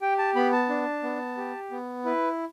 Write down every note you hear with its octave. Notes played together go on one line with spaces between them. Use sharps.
G4 G5
A5
B3 B5
A5
D4
B3
G4
B3
E4 B4